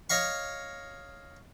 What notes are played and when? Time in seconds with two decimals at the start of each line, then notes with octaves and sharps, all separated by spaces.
0.10 C#5 D#5 F5 C#6